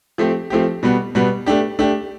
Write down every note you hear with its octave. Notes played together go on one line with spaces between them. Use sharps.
F3 A3 C4 G4
F3 A3 C4 G4
B2 G3 B3
B2 G3 B3
A3 D4 G4
A3 D4 G4